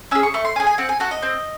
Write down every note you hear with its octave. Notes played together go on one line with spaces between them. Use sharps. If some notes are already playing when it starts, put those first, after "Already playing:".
C#4 G#4 E6
C#6
A3 C#6
C6
C#4 G#4 G#5
G#5
C4 F#5
G#5
F#4 A4 F#5
D#5
C4